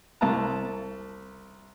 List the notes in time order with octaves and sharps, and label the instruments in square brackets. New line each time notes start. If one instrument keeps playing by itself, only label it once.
[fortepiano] C2 A5 A#5